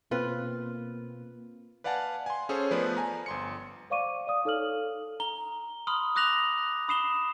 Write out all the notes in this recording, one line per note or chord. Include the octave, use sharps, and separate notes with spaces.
B2 A#3 C4 F4 B4
B4 D5 F5 F#5 G#5 A5
G#5 C6
C#4 G#4 A4 C5 C#5
F3 A3 B3 B4 C5 D5
G#5 A#5
G1 C6 C#7
C5 D5 F5 C#6 D6 D#7
D5 F5 D#6
D#4 A4 C#5 D#6 F6 F#7
A#5 G7
B5 C6 D#6 F6
D6 D#6 F#6 A#6 F7 F#7
B5 D#6 C7 E7 G7